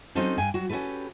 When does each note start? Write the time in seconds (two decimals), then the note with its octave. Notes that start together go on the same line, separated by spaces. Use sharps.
0.15 F#3 C4 C#4 D#4 A4 C5
0.38 G2 G5 G#5
0.54 F#3 F#4
0.69 C#4 F#4 G4 A4 B4